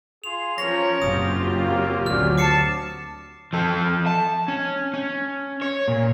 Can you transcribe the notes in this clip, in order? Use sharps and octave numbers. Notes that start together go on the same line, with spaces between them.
F4 G#4 C6 F7
F3 C#4 A#4 C#5 A#6 F7
F#1 F#2 C4 F4 G4 D#6
A#3
D2 F#3 G#4 A#4 D5 F6
A5 D6 C7 C#7
F3 A4
A5
C#4
C#4
C#5
A#2